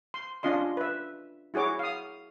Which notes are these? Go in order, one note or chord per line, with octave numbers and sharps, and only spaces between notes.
C6
C#4 D4 F4 D#5 C6
B4 E5
E4 F#4 G#4 C#5 D6
F5 D#6